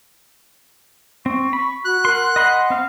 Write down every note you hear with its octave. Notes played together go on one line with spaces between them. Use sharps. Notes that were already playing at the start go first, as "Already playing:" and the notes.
C4 C#6
B5
F#4 F#6
A#4 F#5 C6
D#5 F#5 B5 C6
C4 F5